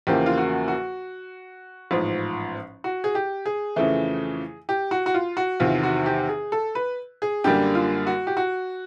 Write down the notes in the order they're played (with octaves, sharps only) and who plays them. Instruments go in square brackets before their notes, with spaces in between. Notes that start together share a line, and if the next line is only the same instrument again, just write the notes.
[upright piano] E2 C#3 F3 A#3 G4
F4
F#4
F#4
A1 G#2 F3
F#4
G#4
G4
G#4
F2 C#3 E3 A3
G4
F#4
F#4
F4
F#4
E2 C3 D#3 F4
F#4
G4
G#4
A4
B4
G#4
F#2 D3 G3 A#3 G4
F4
F#4
G4
F#4